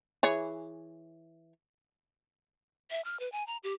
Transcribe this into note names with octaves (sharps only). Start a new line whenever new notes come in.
E3 G#4 C#5
E5
F6
B4
G#5
A#5
G4